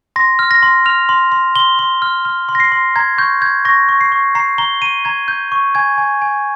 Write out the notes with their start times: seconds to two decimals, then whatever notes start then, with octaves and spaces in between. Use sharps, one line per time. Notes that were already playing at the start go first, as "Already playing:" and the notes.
0.16 C6 A#6
0.39 F6
0.51 A#6
0.63 C6
0.86 F6 F7
1.09 C6
1.32 C6
1.55 C6 G7
1.79 C6
2.02 F6
2.25 F6
2.49 C6
2.55 A#6
2.60 C7
2.72 C6
2.96 A#5 G#6
3.18 C#6 G6
3.42 G6 G#6
3.65 C#6 A#6
3.89 C#6
4.01 C7
4.12 C#6
4.35 A#5 C7
4.58 A#5 G7
4.82 A#5 D#7
5.05 A#5 G#6
5.28 G6
5.52 C#6
5.75 G#5 G#6
5.98 G#5
6.22 G#5